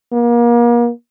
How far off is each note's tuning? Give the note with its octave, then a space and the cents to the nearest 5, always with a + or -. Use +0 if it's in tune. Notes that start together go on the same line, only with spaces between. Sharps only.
A#3 +35